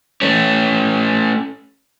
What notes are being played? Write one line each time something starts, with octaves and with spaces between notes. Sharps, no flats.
A3 C#4